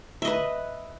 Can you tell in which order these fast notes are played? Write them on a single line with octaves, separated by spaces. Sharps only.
E5 D#5 B4